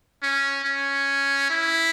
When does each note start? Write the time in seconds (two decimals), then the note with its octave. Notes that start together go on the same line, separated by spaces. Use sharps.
0.22 C#4
0.64 C#4
1.50 E4